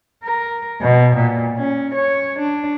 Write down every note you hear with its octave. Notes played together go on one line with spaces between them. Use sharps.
A#4
B2
A#2
C#4
C#5
D4